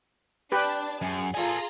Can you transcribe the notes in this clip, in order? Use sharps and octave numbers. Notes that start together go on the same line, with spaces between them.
D4 G4 B4 A5
F#2 G#4
F4 G#4 A4 G#5 A#5